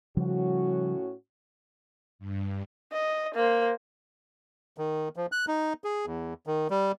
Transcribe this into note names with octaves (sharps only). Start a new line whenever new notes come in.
A2 C#3 F3 G3 C#4 F#4
G2
D#5
A#3 C5
D#3
F3
F#6
D#4
G#4
E2
D#3
G3